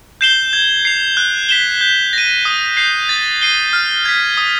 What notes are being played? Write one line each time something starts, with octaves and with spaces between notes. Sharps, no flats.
G6 C7 E7 G7
G#6
C7 F7
F#6
B6 E7 G7
G6
A#6 D#7
D#6
G6 C7
A6
C7 D#7 G7
F6
G#6 B6
D#6